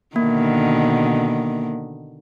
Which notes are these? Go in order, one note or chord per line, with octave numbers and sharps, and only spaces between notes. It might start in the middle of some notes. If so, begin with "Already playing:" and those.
B2 D3 D#3 A#3